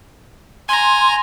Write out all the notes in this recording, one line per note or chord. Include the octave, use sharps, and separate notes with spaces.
G#5 A#5 C6